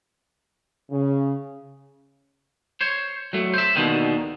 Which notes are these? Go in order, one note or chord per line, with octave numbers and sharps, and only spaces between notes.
C#3
C5 C#5
F#3 A3
C5 E5
D#2 B2 D3 D#3